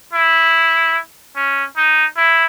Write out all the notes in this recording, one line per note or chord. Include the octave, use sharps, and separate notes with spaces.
E4
C#4
D#4
E4